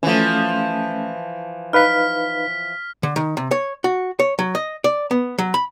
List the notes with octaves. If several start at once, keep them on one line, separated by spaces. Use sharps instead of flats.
E3 F3 A3 C#4
D#4 B4 F5 F6 B6
D3
D#3
C3
C#5
F#4
C#5
F#3
D#5
D5
B3
F#3
B5